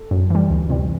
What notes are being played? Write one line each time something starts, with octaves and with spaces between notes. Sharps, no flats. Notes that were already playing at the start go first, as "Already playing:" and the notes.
Already playing: A4
F#2
E3 G3
D2
C3 E3 G3